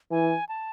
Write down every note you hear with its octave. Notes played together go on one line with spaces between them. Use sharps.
E3 G#5
A5